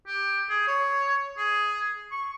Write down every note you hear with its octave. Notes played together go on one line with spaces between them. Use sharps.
G4
G#4
C#5
G#4
C#6